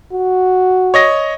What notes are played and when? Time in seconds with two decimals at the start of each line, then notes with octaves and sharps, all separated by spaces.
0.13 F#4
0.94 C#5 D#5 A#6